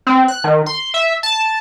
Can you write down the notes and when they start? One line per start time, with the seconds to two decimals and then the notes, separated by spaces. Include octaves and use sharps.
0.07 C4
0.28 F#6
0.44 D#3
0.66 C6
0.94 E5
1.23 A5